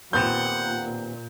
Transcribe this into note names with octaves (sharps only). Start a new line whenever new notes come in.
D#2 A#2 B3 C4 F#5 G6